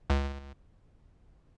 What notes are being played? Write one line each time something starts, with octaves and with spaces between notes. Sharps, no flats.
C#2